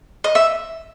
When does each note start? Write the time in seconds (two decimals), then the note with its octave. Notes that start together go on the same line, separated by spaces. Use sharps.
0.24 D#5
0.35 E5